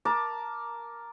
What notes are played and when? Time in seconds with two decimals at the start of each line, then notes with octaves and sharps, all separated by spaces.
0.05 A#4 A5 D6